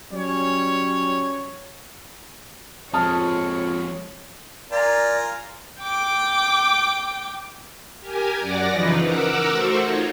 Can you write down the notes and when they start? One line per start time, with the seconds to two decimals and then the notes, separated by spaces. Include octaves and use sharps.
0.13 F#3 G3 C#4 C#5
2.93 F2 F3 G#3 C#5 A5 D#6 F6
4.72 F4 A#4 D5 G#5 A#5
5.82 G5 D6
8.00 G4 A#4 G#5
8.38 F#2 D5 F#5 D6 A#6
8.69 C#3 E3 F3 D#4 B4
9.02 A#4 F#5 D6 E6
9.49 A3 F#4 C5 C#6
9.81 D#4 F4 C#5